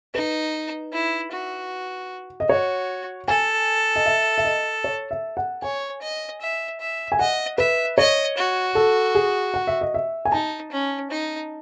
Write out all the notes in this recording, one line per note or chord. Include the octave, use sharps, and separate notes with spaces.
D#4 B4
E4
F#4
D#5
F#4 C#5
A4 G#5
D#5
E5
E5
D#5
C#5
E5
F#5
C#5 G#5
D#5
E5
E5
G#5
D#5 F#5
B4 E5
C#5 D#5
F#4
A4
G#4
F#5
E5
D#5
E5
G#5
D#4 A5
C#4
D#4